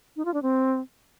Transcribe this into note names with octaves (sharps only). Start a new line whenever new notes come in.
D#4
F4
D4
C4